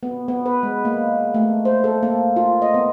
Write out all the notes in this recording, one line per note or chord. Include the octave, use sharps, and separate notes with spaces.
B3
B3
B4
G#3
A#3
A3
C5
A4
A#3
F4
D#5
B3